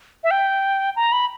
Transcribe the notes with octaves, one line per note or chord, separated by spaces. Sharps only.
E5
G5
A#5
B5